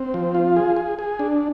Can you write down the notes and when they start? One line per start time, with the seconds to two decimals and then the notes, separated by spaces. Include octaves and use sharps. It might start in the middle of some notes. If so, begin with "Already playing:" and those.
Already playing: C4
0.14 F3
0.35 F4
0.56 G#4
0.76 G#4
0.99 G#4
1.19 D4